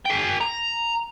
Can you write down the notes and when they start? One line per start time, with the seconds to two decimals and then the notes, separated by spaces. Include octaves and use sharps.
0.05 G#4 G5
0.41 A#5